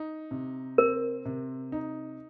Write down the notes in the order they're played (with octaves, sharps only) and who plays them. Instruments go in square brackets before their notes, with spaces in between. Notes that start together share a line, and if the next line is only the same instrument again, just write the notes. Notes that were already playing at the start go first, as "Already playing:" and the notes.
Already playing: [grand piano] D#4
C3
[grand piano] C4 [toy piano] A#4
[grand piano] C3
D#4